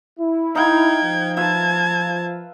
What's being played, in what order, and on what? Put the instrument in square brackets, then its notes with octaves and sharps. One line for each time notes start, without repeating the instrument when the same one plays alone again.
[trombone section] E4
[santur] D#4 F5 [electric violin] G5 G#6
[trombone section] F3
[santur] F4 B4 E5 [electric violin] A5 G#6